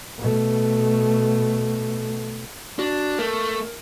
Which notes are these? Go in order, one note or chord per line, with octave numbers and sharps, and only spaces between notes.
B2 A3
D4 F#4
A3 A#4